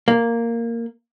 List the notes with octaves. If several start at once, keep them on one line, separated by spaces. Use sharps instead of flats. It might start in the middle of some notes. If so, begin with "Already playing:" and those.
A#3